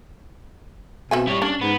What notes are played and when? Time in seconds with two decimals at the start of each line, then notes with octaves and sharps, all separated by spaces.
1.11 B2 C4 E5 G#5
1.27 G3 E4 C#5
1.42 C#4 D4
1.61 G#2 B3